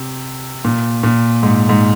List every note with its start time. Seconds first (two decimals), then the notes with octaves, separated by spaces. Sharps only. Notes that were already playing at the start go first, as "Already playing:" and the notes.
Already playing: C3
0.65 A#2
1.03 A#2
1.43 G#2
1.69 G#2